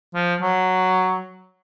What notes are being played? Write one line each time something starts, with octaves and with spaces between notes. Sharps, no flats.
F3
F#3